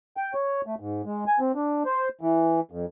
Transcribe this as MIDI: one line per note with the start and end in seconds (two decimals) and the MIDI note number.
0.17 0.33 79
0.34 0.61 73
0.66 0.75 57
0.80 1.02 44
1.05 1.24 56
1.28 1.39 80
1.40 1.52 60
1.55 1.83 62
1.86 2.09 72
2.21 2.60 52
2.71 2.86 41